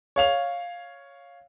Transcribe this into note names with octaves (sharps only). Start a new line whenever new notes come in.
C#5 F5 F7